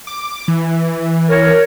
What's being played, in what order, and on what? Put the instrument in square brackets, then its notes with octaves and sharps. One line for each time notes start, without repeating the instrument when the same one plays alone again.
[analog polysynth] D6
E3
[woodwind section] A#4 C#5